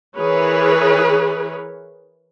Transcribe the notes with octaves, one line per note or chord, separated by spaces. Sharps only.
E3 G#4 A#4 B4 C#5